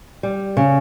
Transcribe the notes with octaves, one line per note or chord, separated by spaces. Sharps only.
G3
C#3